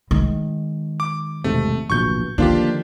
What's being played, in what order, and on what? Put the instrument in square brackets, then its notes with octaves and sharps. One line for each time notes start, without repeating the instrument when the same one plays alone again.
[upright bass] D#3 G#3
[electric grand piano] D6
[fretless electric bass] E1 G#2 C3 [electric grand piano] A3
[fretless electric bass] D1 A#1 B2 [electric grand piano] C#6 G6
[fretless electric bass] D3 D#3 F3 [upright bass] A#3 [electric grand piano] D4 F4 G4